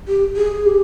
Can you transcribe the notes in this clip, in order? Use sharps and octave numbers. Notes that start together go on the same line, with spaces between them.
G4
G#4
G4